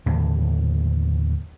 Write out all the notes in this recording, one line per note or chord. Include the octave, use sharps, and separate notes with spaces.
D#2 A2 D3 E3